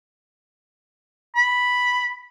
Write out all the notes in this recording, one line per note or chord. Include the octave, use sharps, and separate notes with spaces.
B5